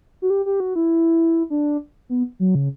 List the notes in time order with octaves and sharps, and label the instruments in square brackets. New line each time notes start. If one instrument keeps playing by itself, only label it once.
[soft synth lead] F#4
G4
G4
F#4
E4
D4
B3
F#3
C#3